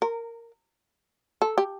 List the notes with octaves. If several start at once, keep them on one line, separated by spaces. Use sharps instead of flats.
A#4
A4
G4